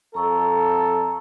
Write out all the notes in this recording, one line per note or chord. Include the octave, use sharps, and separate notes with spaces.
F2 A4 A#5 C#6 E6